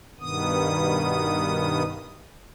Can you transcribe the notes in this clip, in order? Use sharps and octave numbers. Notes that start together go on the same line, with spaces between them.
G2 B2 D#3 B3 D#6